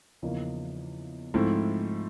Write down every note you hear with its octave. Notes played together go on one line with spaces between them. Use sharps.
E2 C#3 F3 A#3 D#4
G#2 F3 A3 C4 E4